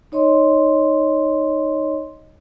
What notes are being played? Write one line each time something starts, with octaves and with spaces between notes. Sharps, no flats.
D#4 C#5 D#5 C6